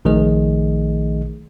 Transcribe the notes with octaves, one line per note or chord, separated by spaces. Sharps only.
A#1 D#3 A3 G#4 D#5